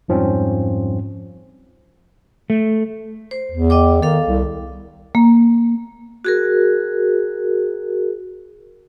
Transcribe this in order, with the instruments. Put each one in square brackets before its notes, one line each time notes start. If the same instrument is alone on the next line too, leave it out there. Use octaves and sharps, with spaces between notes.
[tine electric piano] F2 G#2 F3 G3 C4 C#4
[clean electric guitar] A3
[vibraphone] C5
[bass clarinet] E2
[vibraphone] D#5 G5 D6
[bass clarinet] D#3 [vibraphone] A4 F5
[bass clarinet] C2
[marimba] A#3
[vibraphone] F#4 G#4 A#4